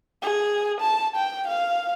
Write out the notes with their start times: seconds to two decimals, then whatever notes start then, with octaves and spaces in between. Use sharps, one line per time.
0.22 G#4
0.81 A5
1.16 G5
1.48 F5